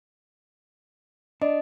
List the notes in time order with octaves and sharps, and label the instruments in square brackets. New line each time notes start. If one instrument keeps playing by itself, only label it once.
[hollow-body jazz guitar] D4 [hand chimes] D#5